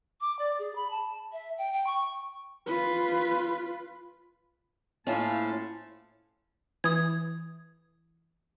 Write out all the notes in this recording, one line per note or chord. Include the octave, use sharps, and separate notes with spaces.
D6
D5
G#4
B5
A5
E5
G5
G5
C#6
F4 B4
A2 F3 A#3 C#4 F4 A5
E3 D#6 G#6